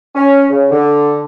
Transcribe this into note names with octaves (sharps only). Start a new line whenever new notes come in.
C#4
C#3
D3